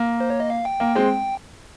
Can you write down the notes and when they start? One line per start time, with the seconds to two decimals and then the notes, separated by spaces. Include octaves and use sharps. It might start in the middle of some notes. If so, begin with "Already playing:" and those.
Already playing: A#3
0.20 C5
0.30 C#5
0.40 D#5
0.50 F5
0.65 G5
0.80 A#3
0.95 G#3 C4